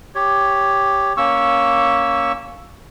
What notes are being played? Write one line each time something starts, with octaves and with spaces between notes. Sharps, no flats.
G4 C#5
A#3 C#4 C#6 E6